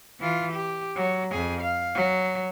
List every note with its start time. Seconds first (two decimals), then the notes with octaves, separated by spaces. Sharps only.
0.20 E3 F4
0.52 G4
0.96 F#3
1.32 F2 G#4
1.62 F5
1.95 F#3